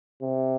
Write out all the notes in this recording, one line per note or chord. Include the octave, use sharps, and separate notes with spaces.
C3